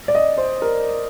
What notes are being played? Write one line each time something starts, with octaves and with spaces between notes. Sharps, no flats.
D5
D#5
C5
A#4